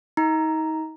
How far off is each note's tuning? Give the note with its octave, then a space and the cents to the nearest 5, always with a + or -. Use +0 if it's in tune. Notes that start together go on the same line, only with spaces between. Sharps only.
D#4 +35 A#5 +0